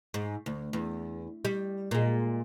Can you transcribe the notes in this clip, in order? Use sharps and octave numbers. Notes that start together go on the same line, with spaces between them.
G#2
D2
E2
G3
A#2 G#3